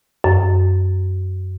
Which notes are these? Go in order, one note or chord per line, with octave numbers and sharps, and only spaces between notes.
F#2